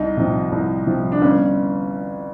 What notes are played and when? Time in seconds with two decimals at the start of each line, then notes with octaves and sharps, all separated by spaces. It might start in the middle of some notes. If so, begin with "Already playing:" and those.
Already playing: C2 D#4
0.17 C3 F3
0.52 C2
0.87 C3 F3
1.12 D4
1.22 G1 C#4